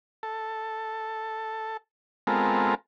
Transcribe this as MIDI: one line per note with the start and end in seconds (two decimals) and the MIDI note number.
0.23 1.77 69
2.27 2.75 56
2.27 2.75 59
2.27 2.75 60
2.27 2.75 65
2.27 2.75 69
2.27 2.75 70